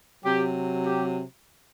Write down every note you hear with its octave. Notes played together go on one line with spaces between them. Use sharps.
C3 F#3 G4
G4